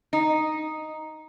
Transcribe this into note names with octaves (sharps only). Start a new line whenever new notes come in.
D#4